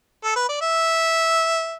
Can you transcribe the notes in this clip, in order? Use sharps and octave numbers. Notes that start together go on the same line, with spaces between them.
A4
B4
D5
E5